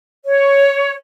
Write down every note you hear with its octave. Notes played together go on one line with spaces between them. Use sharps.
C#5